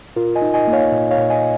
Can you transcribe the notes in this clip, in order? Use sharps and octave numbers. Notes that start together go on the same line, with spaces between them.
A#2 F4 A#4
D#5 G#5
D#4
D#5 G#5
A#3
C#5 F5
A#2
C#5 F5
A#2
D#5 G#5